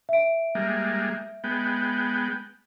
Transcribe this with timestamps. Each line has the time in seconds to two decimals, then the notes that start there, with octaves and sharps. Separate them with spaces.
0.09 E5 D7
0.55 G3 G#3 A#3
1.44 G#3 B3 G5